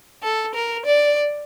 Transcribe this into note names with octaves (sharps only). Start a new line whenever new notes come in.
A4
A#4
D5